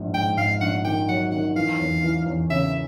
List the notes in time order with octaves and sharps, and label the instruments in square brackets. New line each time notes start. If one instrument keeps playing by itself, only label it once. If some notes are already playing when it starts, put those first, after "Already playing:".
Already playing: [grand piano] A#1 G#2
[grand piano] G#2 [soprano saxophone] G5
[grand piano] G#2 [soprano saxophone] F5
[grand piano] A#1 [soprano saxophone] F#5
[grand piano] D#3 [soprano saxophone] G5
[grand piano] F#3 [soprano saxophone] F#5
[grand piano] D#3 [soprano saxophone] F#5
[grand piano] E3 [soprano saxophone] F5
[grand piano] E2
E3
E2
[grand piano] C#3 [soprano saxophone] E5